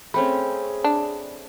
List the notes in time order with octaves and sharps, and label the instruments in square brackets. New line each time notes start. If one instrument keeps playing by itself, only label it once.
[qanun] A3 C4 C#4 [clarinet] G#4 [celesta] B5
[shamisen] D4